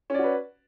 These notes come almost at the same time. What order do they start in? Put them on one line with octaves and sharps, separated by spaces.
C#4 D5 F#4 B4